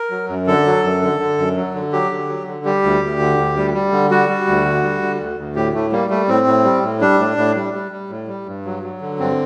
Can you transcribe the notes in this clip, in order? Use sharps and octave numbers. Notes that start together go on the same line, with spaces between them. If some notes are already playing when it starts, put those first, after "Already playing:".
Already playing: A#4
F#3
F#2
D3 A4
F#3
F#2
D3
D3
F#2
F#3
D3
F#3 G4
D3
F#3
D3
G3 G4
D2
D2
D3
D2
G3
G3
D3
G3 F#4
G3
D2
D3
G3
D3
D2
D2
A2 G4
A2 A3
G3 A#3
G3 A3
A2 C4
A2
G3
A2
G3 D4
A2
A2
G3
G3
G3
A2
G3
G2
F#3
F#3
D3
G2 C4